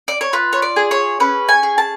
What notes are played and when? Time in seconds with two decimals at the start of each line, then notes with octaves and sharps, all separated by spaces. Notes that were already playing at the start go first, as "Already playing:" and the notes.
0.08 D5
0.21 C#5
0.33 F4 B4
0.53 C#5
0.62 D5
0.76 G#4
0.91 C#5
1.20 C#4 B4
1.49 G#5
1.63 G#4
1.78 A5